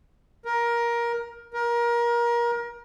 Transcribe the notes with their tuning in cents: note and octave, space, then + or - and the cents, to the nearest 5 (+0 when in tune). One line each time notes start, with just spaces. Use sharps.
A#4 +15
A#4 +25